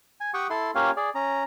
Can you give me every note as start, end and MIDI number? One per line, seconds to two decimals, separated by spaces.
0.21 0.31 80
0.34 0.47 67
0.34 0.47 78
0.34 0.47 79
0.34 0.47 85
0.34 0.47 87
0.50 0.71 64
0.50 0.71 69
0.50 0.71 84
0.75 0.91 58
0.75 0.91 61
0.75 0.91 65
0.75 0.91 67
0.75 0.91 73
0.75 0.91 77
0.97 1.10 68
0.97 1.10 74
1.15 1.43 61
1.15 1.43 82